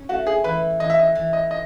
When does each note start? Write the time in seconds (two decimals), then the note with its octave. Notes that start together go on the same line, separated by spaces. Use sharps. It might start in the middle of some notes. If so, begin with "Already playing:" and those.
Already playing: C#4
0.09 A3 F#4
0.27 G#4
0.44 E3 B4
0.80 E3 D#5
0.90 E5
0.99 D#5
1.15 E3
1.33 D#5
1.51 D#5